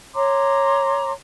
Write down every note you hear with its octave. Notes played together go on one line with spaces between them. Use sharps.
C#5 A#5 C6 D6